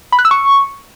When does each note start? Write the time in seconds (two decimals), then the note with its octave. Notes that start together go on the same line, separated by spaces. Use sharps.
0.12 B5
0.19 F#6
0.25 E6
0.31 C#6